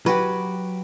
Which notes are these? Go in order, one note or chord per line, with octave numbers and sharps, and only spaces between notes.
F#3 F#4 G4 B4